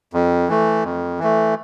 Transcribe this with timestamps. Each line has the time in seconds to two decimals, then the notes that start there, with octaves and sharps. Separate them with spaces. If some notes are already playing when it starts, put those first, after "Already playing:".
0.13 F2
0.49 E3 A3
0.84 F2
1.19 E3 A3